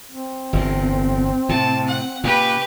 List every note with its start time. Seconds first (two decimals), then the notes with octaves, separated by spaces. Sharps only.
0.11 C4
0.53 G1 E2 A2
1.49 A2 C3 A5
1.87 F#5
2.24 A#2 C#3 G4 B4